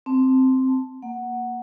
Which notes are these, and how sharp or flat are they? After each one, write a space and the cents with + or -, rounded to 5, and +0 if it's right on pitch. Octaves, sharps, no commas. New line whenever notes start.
C4 +0 A5 +0
A#3 +0 F#5 +0